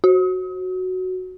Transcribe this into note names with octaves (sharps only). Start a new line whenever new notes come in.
F#4